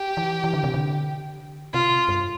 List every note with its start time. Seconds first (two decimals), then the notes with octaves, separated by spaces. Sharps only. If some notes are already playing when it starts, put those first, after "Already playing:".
Already playing: G4
0.17 E3
0.44 E3
0.53 D3
0.64 C3
0.74 D3
1.73 C3 F4
2.08 G2